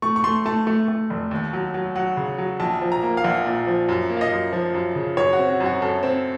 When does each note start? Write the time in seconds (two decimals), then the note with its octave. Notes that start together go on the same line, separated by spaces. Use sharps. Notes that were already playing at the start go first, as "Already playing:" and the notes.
0.02 A3 C#6
0.16 C#6
0.24 A3 C6
0.46 A3 A5
0.67 A3
0.88 A3
1.10 F1
1.31 D#2
1.53 F#3
1.74 F#3
1.96 F#3 F#5
2.17 C#3
2.38 F#3
2.60 A#1 A5
2.81 F3
2.92 A#5
3.03 A#3
3.17 F5
3.24 A#1 F#5
3.46 A#2
3.67 F3
3.89 F#2
4.10 A#3
4.17 F5
4.21 D#5
4.32 F#2
4.53 F3
4.74 F#2
4.95 C#3
5.17 F#2 C#5
5.33 F#4
5.39 C4
5.49 F#4
5.60 F#2
5.66 F#4
5.82 F#2 A4
6.03 C4